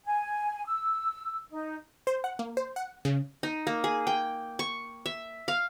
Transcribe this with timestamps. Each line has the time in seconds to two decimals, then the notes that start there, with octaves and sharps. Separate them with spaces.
0.05 G#5
0.66 E6
1.51 D#4
2.07 C5
2.24 F#5
2.39 A#3
2.57 C5
2.76 F#5
3.05 C#3
3.43 D#4
3.67 A#3
3.84 G#4
4.07 G5
4.59 C#6
5.06 E5
5.48 F5